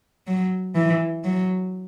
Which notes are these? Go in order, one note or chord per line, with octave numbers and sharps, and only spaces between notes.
F#3
E3
F#3